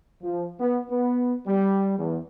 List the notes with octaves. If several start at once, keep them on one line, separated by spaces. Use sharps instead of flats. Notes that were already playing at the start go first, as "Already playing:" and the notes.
F3
B3
B3
G3
E2